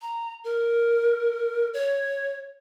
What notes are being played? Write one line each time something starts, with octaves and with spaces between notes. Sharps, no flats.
A#5
A#4
C#5